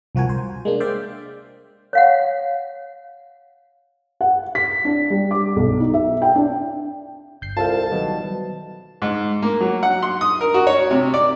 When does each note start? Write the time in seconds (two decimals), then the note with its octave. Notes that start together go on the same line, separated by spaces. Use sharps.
0.15 C2 F3 F#4 A#4 G#5
0.29 C5
0.65 G#3 A#3 D4
0.80 C5 D5 E5 F5 G5
1.93 C#5 F5 F#5
4.21 F#5
4.55 B6
4.85 D4
5.10 G3
5.31 D6
5.56 B1
5.80 D#4
5.94 E5
6.22 G5
6.35 D4
7.41 G1 G6 C7
7.57 C2 F4 A4 F5 A5
7.91 B2 D#3 F#3 G3
9.02 G#2
9.42 A#3
9.61 F#3
9.83 F#5
10.02 C6
10.21 D#6
10.41 A#4
10.54 F#4
10.67 C#5
10.91 C3
11.14 D5